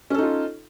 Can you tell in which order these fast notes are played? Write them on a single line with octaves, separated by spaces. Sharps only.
C#4 A4 D#4 F4